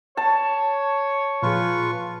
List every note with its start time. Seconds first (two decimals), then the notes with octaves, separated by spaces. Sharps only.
0.17 C#5 A5
1.43 A#2 F3 F4 G#4 B4 C#6